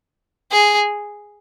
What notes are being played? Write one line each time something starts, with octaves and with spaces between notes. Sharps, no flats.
G#4